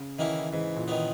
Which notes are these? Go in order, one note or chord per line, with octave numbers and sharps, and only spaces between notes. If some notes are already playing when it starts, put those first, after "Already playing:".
Already playing: C#3
D#3 E3 A#3 C#4 E4
G#2 E3
A#2
D#3 F#3 B3